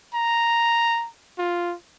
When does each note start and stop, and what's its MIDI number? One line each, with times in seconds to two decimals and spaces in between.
0.14 1.07 82
1.38 1.75 65